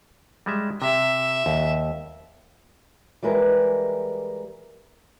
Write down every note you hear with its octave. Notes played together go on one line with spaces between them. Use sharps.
G3 G#3 E5
C3 E5
D#2
E3 G3 G#3 A#4 B4 D#5